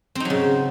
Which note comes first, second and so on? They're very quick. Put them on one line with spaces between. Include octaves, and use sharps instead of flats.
C4 D#4 F#3 C#3